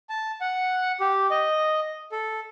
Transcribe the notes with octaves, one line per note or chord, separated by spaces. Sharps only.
A5
F#5
G4
D#5
A4